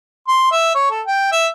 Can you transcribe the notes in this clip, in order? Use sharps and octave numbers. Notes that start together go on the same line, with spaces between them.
C6
E5
C#5
A4
G5
E5